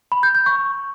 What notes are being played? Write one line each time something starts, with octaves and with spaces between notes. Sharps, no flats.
B5
G6
G6
C#6